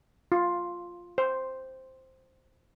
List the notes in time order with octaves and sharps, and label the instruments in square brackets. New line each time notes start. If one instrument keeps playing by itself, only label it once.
[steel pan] F4
C5